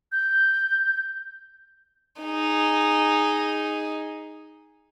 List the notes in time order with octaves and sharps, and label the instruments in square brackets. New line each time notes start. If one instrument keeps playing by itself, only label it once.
[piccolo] G6
[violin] D#4 G#4